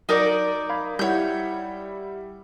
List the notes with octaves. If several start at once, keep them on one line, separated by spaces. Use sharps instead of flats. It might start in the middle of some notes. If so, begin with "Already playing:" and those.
F#3 D#4 A#4 D5
F5 B5 G#6
G3 E4 C#5 F#5 G6